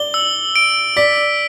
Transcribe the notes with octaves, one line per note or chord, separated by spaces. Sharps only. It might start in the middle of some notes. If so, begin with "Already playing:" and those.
Already playing: D5 G7
E6
D7
D5 B6